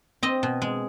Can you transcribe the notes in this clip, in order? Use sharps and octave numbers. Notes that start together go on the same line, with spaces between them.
C4 D#5
B2
G#3